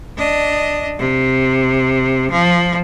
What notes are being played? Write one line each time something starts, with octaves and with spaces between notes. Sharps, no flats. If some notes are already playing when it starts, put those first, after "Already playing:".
D4 D#5
C3
F3